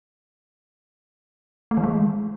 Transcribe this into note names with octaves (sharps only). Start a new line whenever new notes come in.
A3
E3
G#3